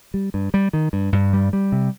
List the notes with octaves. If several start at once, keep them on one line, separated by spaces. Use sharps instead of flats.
G3
G2
G3
D#3
G2
G2
G3
G3
C3